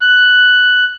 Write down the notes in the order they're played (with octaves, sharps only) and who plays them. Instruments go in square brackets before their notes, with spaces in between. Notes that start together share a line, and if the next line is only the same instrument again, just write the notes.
[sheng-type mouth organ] F#6